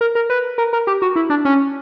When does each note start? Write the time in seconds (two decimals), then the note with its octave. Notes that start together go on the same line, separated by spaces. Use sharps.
0.01 A#4
0.15 A#4
0.30 B4
0.58 A#4
0.73 A#4
0.87 G4
1.02 F#4
1.16 E4
1.30 D4
1.45 C#4